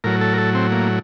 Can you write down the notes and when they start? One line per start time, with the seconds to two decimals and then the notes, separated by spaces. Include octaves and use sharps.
0.04 A2 F#3 A#4
0.21 A4
0.33 A#4
0.38 A4
0.55 C4
0.72 A#3